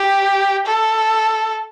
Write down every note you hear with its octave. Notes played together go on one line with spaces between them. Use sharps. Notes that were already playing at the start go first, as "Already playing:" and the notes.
Already playing: G4
A4